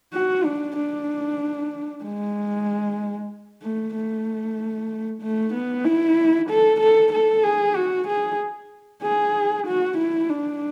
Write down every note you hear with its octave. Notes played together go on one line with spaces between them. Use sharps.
F#4
D4
D4
G#3
A3
A3
A3
B3
E4
A4
A4
A4
G#4
F#4
G#4
G#4
F#4
E4
D4